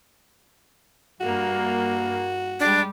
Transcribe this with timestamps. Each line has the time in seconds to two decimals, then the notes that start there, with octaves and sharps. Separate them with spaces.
1.21 G2 A#3 F#4
2.60 G3 G#3 D4 G4